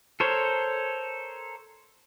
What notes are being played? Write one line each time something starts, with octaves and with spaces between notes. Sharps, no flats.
A4 A#4 C5 C#5